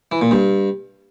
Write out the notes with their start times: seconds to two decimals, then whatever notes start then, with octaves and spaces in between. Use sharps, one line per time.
0.12 E3
0.21 A#2
0.31 G2